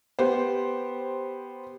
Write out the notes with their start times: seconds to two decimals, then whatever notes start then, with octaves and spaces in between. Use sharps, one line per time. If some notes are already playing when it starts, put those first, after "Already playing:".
0.19 B3 G4 C5